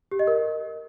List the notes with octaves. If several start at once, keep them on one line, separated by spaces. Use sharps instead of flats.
G4
D#5
A#4